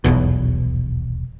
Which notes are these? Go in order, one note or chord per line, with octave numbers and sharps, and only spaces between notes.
D#1 B1 E2 B2